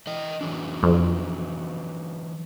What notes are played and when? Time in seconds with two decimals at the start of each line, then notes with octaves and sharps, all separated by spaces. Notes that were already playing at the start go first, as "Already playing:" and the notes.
0.07 E3 D#5 G5
0.41 E3 F#3 D4
0.83 F2